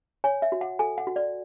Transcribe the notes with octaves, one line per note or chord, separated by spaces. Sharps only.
C#5 G#5
E5
F#4
F#5
A4 G#5
F#5
F#4
D5